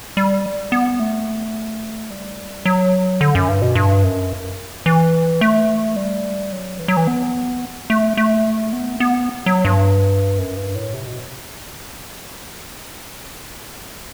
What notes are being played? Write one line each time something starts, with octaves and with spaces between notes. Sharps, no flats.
G3
B3
A3
G3
F#3
D3
F#2
G2
B2
G2
F#2
E3
A3
G3
F#3
E3
F#3
E3
B3
A3
A3
B3
B3
F#3
G2
F#2
G2
A2
C3
B2